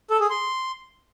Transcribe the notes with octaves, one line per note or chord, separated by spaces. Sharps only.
A4
G#4
C6